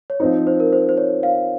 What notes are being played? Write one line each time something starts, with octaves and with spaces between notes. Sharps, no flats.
C#5
F3 C4 D#4 C5
C5
A#4
C5
C5
C#5
F5